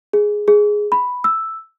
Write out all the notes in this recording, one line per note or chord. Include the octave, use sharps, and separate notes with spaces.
G#4
G#4
B5
E6